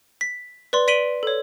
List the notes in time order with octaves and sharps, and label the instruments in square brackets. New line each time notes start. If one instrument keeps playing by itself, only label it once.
[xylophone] B6
B4 D5 C6
D5 B6 D7 D#7 F#7 G7
A4 C#5